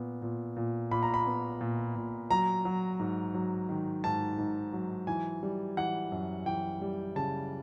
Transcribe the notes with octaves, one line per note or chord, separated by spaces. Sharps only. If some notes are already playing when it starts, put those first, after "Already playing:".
Already playing: A#2 B3
A#2
A#2
A#2 B5
A#5
B5
B3
A#2
A#2
F#3 A#5
F#3
G#2
F#3
D#3
G#2 A5
G#2
F#3
E3 G#5
G3
E3 F#5
F#2
E3 G5
G3
C#3 A5